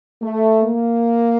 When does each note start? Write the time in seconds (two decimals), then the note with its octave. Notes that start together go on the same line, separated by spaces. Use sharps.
0.23 A3
0.64 A#3